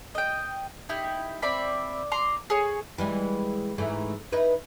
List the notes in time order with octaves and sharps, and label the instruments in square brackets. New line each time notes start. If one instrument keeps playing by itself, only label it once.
[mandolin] D#5 G5
D#4 E4 G4
C4 D5 E5 B5
A#5 C6 D6
G#4 C#5
[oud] E3 G3 G#3
G#2 E3 A3
D#4 E4 B4